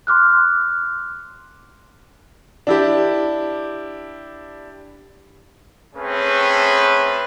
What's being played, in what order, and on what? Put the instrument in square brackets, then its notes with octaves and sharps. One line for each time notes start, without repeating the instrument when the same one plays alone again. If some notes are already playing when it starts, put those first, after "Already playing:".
[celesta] C6 D6 F6 F#6
[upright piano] D4 E4 G4
[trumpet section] A3 C4 C#4 G#4 B4